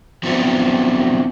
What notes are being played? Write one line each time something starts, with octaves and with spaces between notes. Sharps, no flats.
F3 F#3 B3 C4 D4 E4